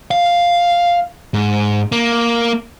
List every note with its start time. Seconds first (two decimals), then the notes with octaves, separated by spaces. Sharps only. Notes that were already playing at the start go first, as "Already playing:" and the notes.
0.11 F5
1.34 G#2
1.92 A#3